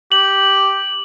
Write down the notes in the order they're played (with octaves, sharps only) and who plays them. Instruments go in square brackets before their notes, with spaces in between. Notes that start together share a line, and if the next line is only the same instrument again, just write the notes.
[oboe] G4 [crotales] F#7